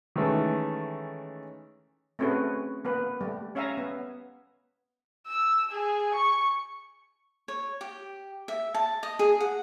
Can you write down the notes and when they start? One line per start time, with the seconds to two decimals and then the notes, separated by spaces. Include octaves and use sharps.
0.16 D#3 E3 G#3 A3 C#4
2.19 A3 C4 C#4 F#4 G#4 B4
2.85 A#3 B3 B4
3.21 G3 A3
3.55 C#4 C#5 E5 F5 G#5 A#5
3.77 B3
5.28 E6
5.71 G#4
6.14 C#6
7.48 C#5
7.81 G4
8.48 E5
8.74 A5
9.03 D#5
9.19 G#4
9.40 F#5